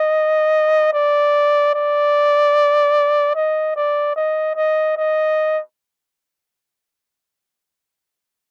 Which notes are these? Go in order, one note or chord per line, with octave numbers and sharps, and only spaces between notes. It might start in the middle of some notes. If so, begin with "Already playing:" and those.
Already playing: D#5
D5
D5
D#5
D5
D#5
D#5
D#5